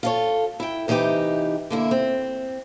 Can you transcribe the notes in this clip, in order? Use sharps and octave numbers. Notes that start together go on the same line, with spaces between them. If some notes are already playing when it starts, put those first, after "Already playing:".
F4 A4 C#5
E4 G5
C3 E3 D#4 E4 G4 B4
D3 A#3 E4
C4